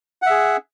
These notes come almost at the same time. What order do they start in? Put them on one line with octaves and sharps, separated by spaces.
F#5 E5 G#4